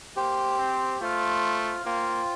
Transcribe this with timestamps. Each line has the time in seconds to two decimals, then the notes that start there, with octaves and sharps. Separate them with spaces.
0.16 A#3 G4 C5 G5
0.58 C4
1.01 A3 F4 C5 F5
1.85 A#3 F4 C5 G5